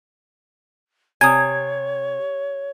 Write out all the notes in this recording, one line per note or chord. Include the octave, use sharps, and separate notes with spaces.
C3 C#5 G#5 D#6 G#6